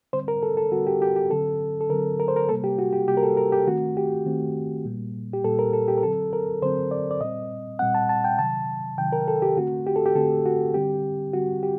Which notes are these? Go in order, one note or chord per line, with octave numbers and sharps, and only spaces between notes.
D3 G3 C4 C5
A#4
A4
A4
D3 G3 C4 F#4
G4
G4
G4
D3 F#3 C4 A4
A4
D3 F#3 C4 A#4
A#4
C5
A#4
C3 G3 A#3 A4
G4
F#4
G4
C3 G3 A#3 G4
A#4
A4
A#4
G4
D#3 A3 C4 F#4
G4
D#3 A3 C4
A#2 G3 A#3
G4
A#2 G3 A#3 A4
A#4
A4
G4
A#4
D3 F#3 C4 A4
A#4
D3 F#3 C4 C5
D5
D5
A#2 G3 C4 D#5
A#2 G3 C4 F#5
A5
A5
G5
C3 D#3 F#3 A5
C3 D#3 F#3 G5
A#4
A4
G4
D3 A3 C4 F#4
G4
A4
G4
D3 A3 C4 A4
F#4
D3 G3 C4 G4
D3 G3 C4 F#4
G4